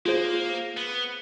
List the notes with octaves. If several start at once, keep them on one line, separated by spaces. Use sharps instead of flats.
A#3 F4 G#4 C5
B3